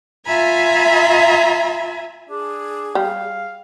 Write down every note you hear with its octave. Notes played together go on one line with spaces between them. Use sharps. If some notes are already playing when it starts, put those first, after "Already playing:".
F4 E5 G#5 A#5 B5
D4 G#4
G3 F5